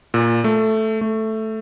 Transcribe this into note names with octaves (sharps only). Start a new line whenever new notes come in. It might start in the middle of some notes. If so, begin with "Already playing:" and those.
A#2
A3
A3